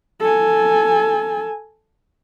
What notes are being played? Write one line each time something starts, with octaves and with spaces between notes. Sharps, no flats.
A4 G#5